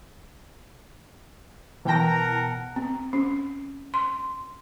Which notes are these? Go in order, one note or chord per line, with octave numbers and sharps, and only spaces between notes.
B2 E3 A#4 F#5 G5 A5 A#5 A#6
C4
C#4
C6